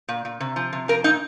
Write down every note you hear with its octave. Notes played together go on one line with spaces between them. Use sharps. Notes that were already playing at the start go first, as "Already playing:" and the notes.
A#2
A#2
C3
F3
C3
F3 A#4
A#2 D#4